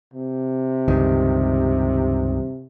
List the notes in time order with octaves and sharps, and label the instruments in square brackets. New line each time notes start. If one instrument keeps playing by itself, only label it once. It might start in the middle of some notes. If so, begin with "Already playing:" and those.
[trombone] C3
[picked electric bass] C#2 G2 D#3